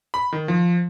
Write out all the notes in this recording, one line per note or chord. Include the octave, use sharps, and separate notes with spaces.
B5
D#3
F3